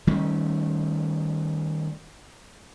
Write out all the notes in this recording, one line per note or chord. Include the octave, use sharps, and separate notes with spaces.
D#3 G3 A3 C#4